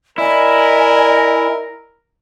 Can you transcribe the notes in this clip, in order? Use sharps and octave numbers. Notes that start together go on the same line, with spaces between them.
E4 A#4 D5 D#5 G#5